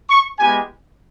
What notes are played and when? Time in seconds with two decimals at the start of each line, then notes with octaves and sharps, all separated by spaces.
0.10 C#6
0.39 G#3 B3 E4 G4 G#5